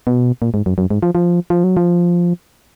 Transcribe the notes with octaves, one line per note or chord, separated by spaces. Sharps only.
B2
A#2
G#2
F#2
F#2
G#2
F3
F3
F3
F#3
F3